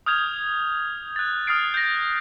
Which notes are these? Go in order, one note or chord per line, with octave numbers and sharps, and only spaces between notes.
D#6 F6 G6 G#6 F7
F#6 A6
D#6 F6 F#6 A6 C7 D7
G6 A#6